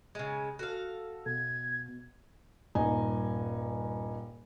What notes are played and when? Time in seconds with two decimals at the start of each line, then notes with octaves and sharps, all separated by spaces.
0.15 C#3 G#3
0.59 F#4 A4 F5
1.26 B2 G#6
2.75 D#1 G2 D#4 D#5 G#5